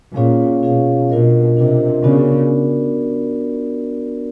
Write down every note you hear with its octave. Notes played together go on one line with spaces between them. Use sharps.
A#2 C#4 F4 G#4 C#5 F5
B2 C#4 F4 G#4 C#5 F5
B2 D4 F4 A#4 D#5
C3 D4 F4 A#4 D#5
C#3 B3 D4 F#4 A#4 D5